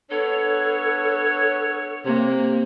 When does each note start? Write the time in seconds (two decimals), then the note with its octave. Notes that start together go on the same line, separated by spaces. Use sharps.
0.11 B3 D4 A4 C#5
2.05 C3 A#3